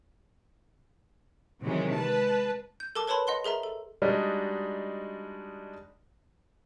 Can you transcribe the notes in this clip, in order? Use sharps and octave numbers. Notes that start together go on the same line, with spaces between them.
C3 D#3 E3 F#3 G#3
G#3 B4 A5
G6
A4 A#4 A5 D6
A#4 B4 C#5 A5 B5 C6
D#5 F#5 C6 G7
G#4 A#4 E5 A#5
A4
G3 G#3 D4 D#4 F#4